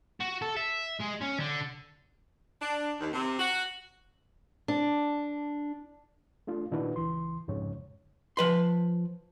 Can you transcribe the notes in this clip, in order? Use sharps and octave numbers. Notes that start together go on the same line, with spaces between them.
F#4
A4
E5
G#3
C#4
D3
D4
D#2
C3
F#4
D4
A3 D4 F4
A#2 D#3 D4 E4 F#4 B4
C#2 E3 C6
C2 F2 G#2 C#3 C#5
F3 B4 C6